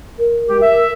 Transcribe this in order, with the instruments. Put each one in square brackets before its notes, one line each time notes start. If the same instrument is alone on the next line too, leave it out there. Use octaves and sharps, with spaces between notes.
[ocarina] A#4
[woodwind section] G#3 G4
E5